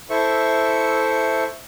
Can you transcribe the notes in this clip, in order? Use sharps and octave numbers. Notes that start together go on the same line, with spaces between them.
E4 A4 C5 E5 C#6